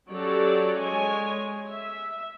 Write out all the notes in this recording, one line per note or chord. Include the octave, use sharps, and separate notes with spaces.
F#3 C#4 G4 A4 C#5 D5
G#3 C#5 G#5
E5